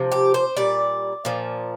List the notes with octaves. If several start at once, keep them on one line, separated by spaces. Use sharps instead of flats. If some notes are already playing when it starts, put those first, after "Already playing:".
Already playing: C3 F3
G4
C5
A#2 G3 D5
A#2 F3